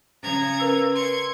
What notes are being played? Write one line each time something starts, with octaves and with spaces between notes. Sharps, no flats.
C#3 A#5 G#6
A#4 B4 E6
C6 C#6 G#6